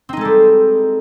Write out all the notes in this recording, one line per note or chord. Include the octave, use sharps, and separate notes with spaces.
G3 G#3 C4 D#4 A4